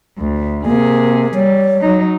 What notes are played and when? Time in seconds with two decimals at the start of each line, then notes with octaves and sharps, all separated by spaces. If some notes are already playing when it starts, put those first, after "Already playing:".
0.18 D2
0.65 C3 A#3 G#4
1.34 G3 C#5
1.81 F#3 D#4